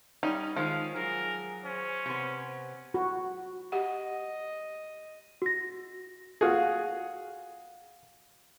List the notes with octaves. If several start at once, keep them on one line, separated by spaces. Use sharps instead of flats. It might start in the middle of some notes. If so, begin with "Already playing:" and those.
G3 C#4 D#4
D#3 F3 G#3 F5
F#3 G#4 A#4
C#4 C5
C3 B3
F#4
G4 D#5 F#5
F#4 A#6
F4 F#4 G#4